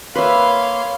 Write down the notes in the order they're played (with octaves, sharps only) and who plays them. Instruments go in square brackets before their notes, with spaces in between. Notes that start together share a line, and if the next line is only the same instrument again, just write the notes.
[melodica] A#3 C6 [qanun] B4 E5 [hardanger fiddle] C#5 F5